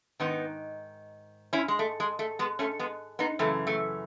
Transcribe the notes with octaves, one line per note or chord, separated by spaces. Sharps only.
G#2 D#3 B3 D#4
C#4 E4
G#3
A3
G#3
A3
G#3 B3
A3 C#4
G#3 B3
B3 D#4
F#2 C#3 E3 A3
A3